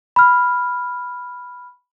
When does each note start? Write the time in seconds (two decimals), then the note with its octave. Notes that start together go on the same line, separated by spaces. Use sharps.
0.16 B5 F6